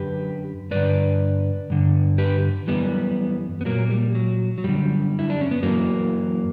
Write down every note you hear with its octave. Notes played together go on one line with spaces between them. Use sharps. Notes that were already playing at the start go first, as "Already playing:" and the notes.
Already playing: F#2 D3 G4 B4
G2 D3 B4 D5
G2 D3
G4 B4
F#2 E3 G3 B3
B3
A#2 F#3 A#3
G3
F#3
F#3
F#2 D3 G3
E4
D4
C#4
B3
F#2 E3 F#3 A#3